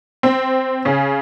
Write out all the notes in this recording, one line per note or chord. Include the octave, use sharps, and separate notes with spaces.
C4
C#3 C#4